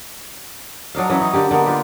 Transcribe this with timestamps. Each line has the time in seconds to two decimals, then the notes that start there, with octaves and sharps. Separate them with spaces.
0.95 F#3 D4 D#4 F5
1.09 E3 F#3 C#4
1.21 D#4
1.33 D3 A#3 G4
1.51 D3 A#3 B3 D#4
1.66 D4 F4 G4